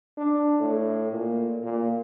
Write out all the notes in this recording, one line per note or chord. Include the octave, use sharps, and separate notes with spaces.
D4
A2
A#2
A#2